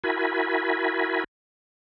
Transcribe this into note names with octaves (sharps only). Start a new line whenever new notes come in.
E4 F#4 A#4 G#5 B5